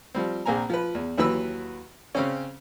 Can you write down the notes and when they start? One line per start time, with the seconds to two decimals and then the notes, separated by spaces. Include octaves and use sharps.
0.15 F3 G3 C4
0.46 A#1 A#3 C4 G#5 A#5
0.69 F3 B4
0.94 E2
1.17 D#2 E3 F#3 B4 E6
2.15 C#3 C4 C#4